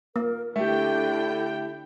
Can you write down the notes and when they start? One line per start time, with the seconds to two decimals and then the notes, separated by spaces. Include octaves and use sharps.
0.16 A#3 A#4
0.56 D3 A3 E4 G4 G5